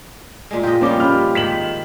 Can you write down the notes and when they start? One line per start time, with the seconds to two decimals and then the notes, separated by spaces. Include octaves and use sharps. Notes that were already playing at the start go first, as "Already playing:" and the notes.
0.51 A#2 G#3
0.63 F4 G4 D#5
0.81 F3 G3 A#3 C#4 F4 D6
1.00 G4 B5 F6
1.35 G#2 D#3 B6 E7 F#7